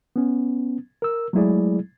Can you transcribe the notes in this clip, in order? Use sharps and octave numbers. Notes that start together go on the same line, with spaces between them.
B3 C#4
A#4 E6
F#3 G#3 A3 E4 G#4 D5